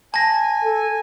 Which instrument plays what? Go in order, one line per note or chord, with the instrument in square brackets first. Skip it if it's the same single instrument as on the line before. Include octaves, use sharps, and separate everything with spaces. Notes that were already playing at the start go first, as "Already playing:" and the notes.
[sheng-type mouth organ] G#5 [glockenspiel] A5 A#6
[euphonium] A4